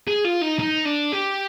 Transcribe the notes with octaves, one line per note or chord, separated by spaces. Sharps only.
G#4
F4
D#4
D#4
D4
G4